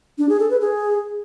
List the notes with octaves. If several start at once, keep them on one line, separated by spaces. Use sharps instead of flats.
D4
G#4
A4
B4
G#4